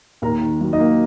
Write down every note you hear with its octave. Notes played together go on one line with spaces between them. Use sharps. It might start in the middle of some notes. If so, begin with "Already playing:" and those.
D#2 A#4 A#5
D#3
F#3
D#4 D#5
A#3